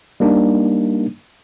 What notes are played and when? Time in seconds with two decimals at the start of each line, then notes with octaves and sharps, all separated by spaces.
0.20 G3 A#3 D4 D#4